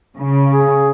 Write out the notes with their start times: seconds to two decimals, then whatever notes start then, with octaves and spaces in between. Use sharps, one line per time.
0.17 C#3
0.50 G#4